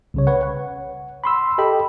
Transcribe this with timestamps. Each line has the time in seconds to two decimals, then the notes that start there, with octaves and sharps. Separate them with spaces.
0.14 C2 C#3 C#5
0.27 B4 C#5 F#5
0.43 F#5
1.24 B5 C6 E6
1.58 G4 A4 D#5 G5 B5